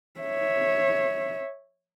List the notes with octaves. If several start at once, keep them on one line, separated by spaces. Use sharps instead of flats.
C#5 E5